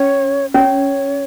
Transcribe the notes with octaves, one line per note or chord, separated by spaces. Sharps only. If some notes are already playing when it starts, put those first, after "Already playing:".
Already playing: C#4 C#5
C#4 C#5